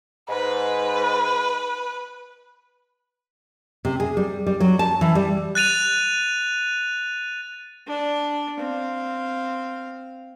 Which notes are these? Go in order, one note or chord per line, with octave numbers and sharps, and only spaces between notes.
G#2 B4
C3
G#4
G3
G3
F#3
A5
E3
G3
F#6 A6 D#7 F7
D4
C4 F5